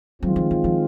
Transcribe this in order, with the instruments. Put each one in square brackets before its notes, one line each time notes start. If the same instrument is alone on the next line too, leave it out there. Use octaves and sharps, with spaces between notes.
[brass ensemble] D#3 G#3 C4 F4 [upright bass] F#3
[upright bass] F3
E3
F3